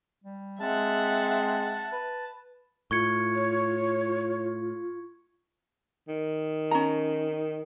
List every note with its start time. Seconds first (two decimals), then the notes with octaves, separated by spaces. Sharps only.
0.24 G3
0.60 G#3 C4 E5 F#5 A5
1.92 B4
2.91 A2 F4 C#6 G#6 C#7
3.34 C#5
6.08 D#3
6.71 C#4 A#5